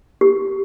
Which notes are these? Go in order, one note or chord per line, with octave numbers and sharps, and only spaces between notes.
G4